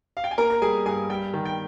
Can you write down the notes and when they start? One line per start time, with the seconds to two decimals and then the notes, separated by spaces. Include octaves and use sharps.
0.17 F5
0.24 G5
0.31 G#5
0.38 A#3 A#4 A#5
0.50 A#5
0.62 G3 G#4 G#5
0.86 G2 G#4 G#5
1.09 G3 G5
1.34 D#3
1.45 G5